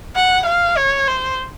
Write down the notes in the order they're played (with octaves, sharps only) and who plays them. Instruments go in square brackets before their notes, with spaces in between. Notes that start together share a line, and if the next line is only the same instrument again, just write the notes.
[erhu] F#5
F5
C#5
C5